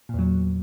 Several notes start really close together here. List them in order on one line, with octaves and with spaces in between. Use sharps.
A#2 E2 F#3